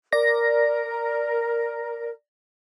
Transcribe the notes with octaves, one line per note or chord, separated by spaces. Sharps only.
A#4 D5 A#6